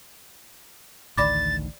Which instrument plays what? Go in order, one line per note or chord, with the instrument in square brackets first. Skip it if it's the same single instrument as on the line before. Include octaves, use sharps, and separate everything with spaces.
[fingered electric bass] A1 D2 D#3 [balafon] D5 B5 D6 [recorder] A6